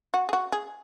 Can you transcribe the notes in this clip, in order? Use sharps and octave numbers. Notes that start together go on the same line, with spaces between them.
F#4
G#4
F#4
G#4